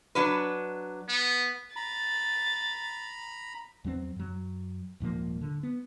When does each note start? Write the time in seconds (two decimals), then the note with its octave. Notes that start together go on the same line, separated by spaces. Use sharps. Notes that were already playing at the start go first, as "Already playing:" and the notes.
0.15 F#3 D4 B4
1.09 B3
1.76 A#5 B5 A6
3.84 E2 F#3 B3 C4
4.16 F#2 F#3
5.00 D#1 G#2 F3 A#3
5.41 D3
5.63 B3